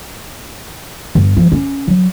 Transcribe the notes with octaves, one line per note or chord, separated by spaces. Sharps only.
G1
F3
C#4
F#3